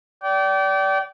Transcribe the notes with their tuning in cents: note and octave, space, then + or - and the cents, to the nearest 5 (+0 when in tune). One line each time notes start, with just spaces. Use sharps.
D5 -25 G5 -30